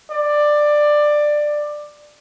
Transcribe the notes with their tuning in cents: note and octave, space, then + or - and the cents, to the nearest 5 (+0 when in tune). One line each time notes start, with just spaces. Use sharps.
D5 +15